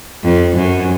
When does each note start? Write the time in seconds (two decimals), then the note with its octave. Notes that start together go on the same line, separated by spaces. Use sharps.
0.23 F2
0.56 F#2